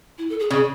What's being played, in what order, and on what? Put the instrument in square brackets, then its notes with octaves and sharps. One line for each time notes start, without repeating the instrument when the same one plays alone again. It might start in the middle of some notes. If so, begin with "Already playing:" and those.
[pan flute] E4
A4
G#4
[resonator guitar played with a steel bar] C#3 [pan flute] G#4